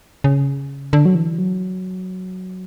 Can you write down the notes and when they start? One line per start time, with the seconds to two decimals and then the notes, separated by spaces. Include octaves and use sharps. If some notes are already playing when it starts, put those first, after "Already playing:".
0.24 C#3
0.93 D3
1.05 F#3
1.15 E3
1.38 F#3